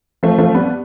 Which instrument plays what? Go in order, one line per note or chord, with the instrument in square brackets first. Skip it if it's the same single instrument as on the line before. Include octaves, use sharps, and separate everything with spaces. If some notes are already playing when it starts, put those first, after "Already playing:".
[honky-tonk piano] F3 A3
F3 A3
G3 B3